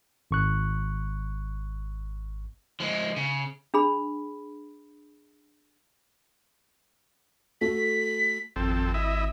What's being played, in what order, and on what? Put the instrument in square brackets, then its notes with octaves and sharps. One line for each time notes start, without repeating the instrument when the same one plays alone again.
[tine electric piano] G#1 C#6 F#6
[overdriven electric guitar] F3 G#3
C#3
[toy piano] D4 G#4 B5
[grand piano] A3 F#4 A4 [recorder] B6
[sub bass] G#1 [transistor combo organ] F2 C4 A4
[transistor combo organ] E4 D#5 E5